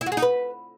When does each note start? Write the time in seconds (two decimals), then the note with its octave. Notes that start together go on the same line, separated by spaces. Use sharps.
0.01 E4
0.06 F#4
0.12 G#4
0.17 D#4
0.22 B4